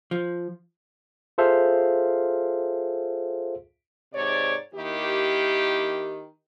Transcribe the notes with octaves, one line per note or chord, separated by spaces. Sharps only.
F3
F4 G#4 A4 C5 E5 F5
G#2 C3 C#5 D5
D#3 A#3 E4 G4